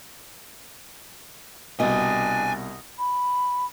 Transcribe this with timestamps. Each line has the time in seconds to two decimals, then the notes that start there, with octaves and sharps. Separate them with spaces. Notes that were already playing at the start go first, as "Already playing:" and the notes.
1.80 C2 B2 D4 D#5 G5 G#5
2.99 B5